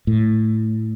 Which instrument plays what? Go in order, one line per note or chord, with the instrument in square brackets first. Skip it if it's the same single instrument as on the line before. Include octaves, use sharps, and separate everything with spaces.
[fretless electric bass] A2